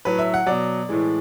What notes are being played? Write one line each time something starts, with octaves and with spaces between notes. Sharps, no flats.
A2 F#3 B4
E5
F#5
B2 F#3 D5
A2 E3 G#3